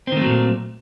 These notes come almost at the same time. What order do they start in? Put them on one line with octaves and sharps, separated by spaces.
C4 D#3 A3 F#3 A#2